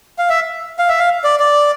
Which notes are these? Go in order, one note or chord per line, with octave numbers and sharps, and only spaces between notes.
F5
E5
F5
E5
F5
D5
D5